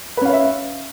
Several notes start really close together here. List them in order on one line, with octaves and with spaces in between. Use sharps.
B4 C#4 F5 C#5 E5